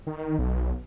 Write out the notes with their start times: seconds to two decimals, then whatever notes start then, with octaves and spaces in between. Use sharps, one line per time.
0.07 D#3
0.39 B1